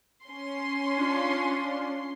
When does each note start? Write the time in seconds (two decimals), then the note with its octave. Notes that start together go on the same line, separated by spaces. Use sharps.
0.24 C#4 C6
0.98 D4 F4